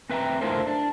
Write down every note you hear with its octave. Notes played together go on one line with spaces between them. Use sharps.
C4 B4 E5 F#5 G5 A#5
A3 D4 E4 F4 A#4 C5
D4